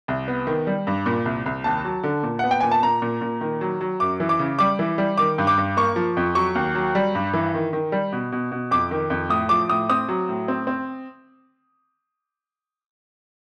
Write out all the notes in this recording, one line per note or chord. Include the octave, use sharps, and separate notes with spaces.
C2
B3
D#3
G3
G2
A#2
C2
C2
D#2 A5
F#3
D3
A#2
B3 F#5
G5
A#2 G#5
A5
A#2 A#5
A#2
A#2
D#3
F#3
F#3
F#2 D6
E3
D6
C#3
G3 D6
E3
G3
D#3 D6
G2
D6
G2
A#3 C#6
F3
F2
F#3 C#6
D#2
F#3
G3
G2
E3
D#3
D#3
G3
B2
B2
B2
F2 D6
D#3
F2
A2 D#6
F3 D6
A2 D#6
C4 D#6
F#3
A2
C4
C4